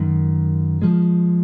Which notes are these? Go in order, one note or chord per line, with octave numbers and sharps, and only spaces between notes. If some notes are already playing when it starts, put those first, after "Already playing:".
Already playing: F#2 D#3 G#3
F3 G#3